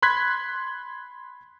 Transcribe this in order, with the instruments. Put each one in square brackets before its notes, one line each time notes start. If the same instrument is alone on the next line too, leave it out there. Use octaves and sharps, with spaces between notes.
[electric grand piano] B5 C6 F#6 G#6 B6